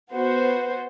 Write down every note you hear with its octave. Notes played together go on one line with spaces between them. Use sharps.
B3 F#4 C5